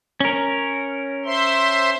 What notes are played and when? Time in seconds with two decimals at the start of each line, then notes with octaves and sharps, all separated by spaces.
0.20 C#4 A#4
1.25 C5 E5 C6